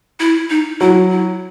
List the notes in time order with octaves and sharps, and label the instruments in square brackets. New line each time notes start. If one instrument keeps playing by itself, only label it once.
[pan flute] E4
D#4
[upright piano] F#3 [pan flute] E4
[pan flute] E4